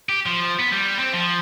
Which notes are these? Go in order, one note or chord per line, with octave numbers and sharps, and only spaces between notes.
G4
F3
B3
G3
C4
F3